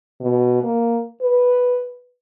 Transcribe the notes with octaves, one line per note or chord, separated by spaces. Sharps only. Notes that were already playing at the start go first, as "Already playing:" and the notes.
B2
A#3
B4